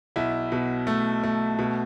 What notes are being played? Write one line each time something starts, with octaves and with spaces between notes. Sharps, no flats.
B1 E4
B2
A3
A3
B2